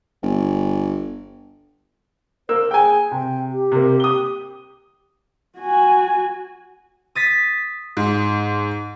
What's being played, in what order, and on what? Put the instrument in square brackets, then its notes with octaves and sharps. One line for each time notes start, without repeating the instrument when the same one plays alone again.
[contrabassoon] G1
[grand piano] A#3 E6 [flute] C5
[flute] G#4 [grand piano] G5 G#5
[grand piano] C3 [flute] G5
[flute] G4
[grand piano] C3 A#3
D#6 G7
[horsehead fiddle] F#4 G#5
[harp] D#6 A6 B6
[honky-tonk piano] G#2